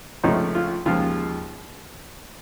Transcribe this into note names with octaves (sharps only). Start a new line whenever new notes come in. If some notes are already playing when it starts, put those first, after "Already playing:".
C#2 C3 F3 A3 C#4 D#4
F4
D#2 C#3 F3 G#3 F4